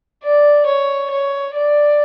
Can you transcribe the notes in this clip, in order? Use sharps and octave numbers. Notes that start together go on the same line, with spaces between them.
D5
C#5
C#5
D5